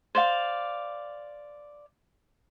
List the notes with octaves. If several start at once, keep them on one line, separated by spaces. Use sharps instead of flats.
C5 D5 F5